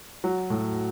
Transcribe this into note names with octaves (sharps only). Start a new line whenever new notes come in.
F#3
A2